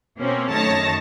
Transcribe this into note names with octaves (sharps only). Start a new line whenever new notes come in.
B2 A#3 C4 C#4
F#2 D#3 A3 C#5 A5 A#6